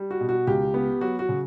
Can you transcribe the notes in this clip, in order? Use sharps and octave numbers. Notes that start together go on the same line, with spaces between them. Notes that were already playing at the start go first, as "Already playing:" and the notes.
Already playing: G3
F#4
B2
F#4
C#2 G4
B3
F#3 F#4
F#4
C#3